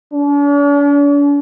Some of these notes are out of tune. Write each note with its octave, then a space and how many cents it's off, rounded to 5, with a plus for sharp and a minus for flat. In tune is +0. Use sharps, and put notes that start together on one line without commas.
D4 -45